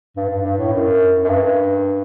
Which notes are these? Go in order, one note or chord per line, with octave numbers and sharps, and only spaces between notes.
G2
G2
G2
A2
F#2
F#2
G2